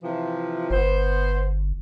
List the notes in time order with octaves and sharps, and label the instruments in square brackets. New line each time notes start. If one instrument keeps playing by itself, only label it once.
[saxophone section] C3 E3 F3
[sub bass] G1 [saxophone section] B3 C5